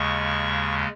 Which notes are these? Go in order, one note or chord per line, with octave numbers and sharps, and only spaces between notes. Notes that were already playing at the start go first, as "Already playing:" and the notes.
Already playing: D#2 C#3 G#3 C#6